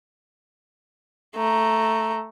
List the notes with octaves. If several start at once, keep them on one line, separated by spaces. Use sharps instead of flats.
A3 A#5